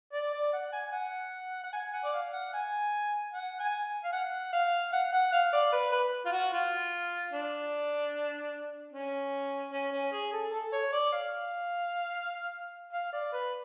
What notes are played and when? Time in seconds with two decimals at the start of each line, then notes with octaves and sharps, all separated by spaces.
0.13 D5
0.34 D5
0.53 F#5
0.72 G#5
0.93 F#5
1.64 F#5
1.73 G#5
1.93 F#5
2.04 D5
2.13 F5
2.33 F#5
2.53 G#5
3.33 F#5
3.60 G#5
4.04 F5
4.13 F#5
4.53 F5
4.93 F#5
5.13 F#5
5.32 F5
5.53 D5
5.73 B4
5.92 B4
6.25 F4
6.32 F#4
6.53 F4
7.32 D4
8.93 C#4
9.73 C#4
9.92 C#4
10.12 G#4
10.33 A4
10.53 A4
10.73 C#5
10.93 D5
11.13 F5
12.93 F5
13.13 D5
13.33 B4